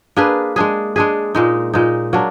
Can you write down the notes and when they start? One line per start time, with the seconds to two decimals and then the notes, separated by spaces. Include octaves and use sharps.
0.16 A#3 D4 G#4 B4
0.56 G#3 D4 G#4
0.96 G#3 D4 G#4
1.35 A#2 G#3 D#4
1.73 A#2 G#3 D#4
2.13 F#3 A#3 D4